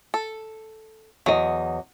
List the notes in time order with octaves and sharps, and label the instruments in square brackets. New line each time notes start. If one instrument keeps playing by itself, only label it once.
[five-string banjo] A4
[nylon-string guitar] E2 D#5 [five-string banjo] F#3